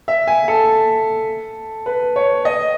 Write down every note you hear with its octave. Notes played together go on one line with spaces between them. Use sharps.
E5
G#5
A4
B4
C#5
D#5